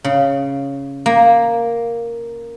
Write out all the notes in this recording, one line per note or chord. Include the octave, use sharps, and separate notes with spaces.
C#3
A#3